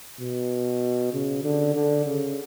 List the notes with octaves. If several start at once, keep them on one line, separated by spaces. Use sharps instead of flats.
B2
C#3
D3
D3
C#3